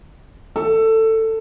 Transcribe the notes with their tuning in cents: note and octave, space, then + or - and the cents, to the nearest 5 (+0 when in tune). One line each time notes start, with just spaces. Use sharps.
A4 +15